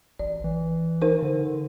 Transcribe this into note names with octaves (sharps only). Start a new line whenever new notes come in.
A1 D5
E3
D#4 A#4 C5
D3